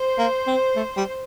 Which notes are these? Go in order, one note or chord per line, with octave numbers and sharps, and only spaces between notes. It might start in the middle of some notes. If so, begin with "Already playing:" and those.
Already playing: C5
A#3
C4
A3
G3